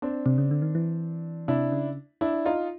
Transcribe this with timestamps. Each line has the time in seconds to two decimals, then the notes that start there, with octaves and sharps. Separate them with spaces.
0.02 C4 D4
0.26 C3
0.38 C#3
0.51 D3
0.62 D#3
0.75 E3
1.48 C3 D4 E4
1.72 C#3
2.21 D4 E4
2.45 D#4 F4